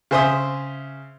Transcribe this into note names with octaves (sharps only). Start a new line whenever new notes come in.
C#3 G#4 C5 E5 C6 D#6